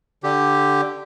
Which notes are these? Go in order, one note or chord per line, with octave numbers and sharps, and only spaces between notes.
D3 G4